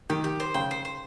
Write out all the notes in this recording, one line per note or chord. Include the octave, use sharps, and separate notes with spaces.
D#3 G4
G4
C5
C#3 G5
C5
C5